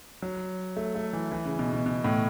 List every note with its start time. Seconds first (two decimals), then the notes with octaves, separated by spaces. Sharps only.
0.22 F#3
0.77 A3
0.95 A3
1.13 E3
1.32 E3
1.45 C#3
1.59 B2
1.73 B2
1.86 B2
2.04 A2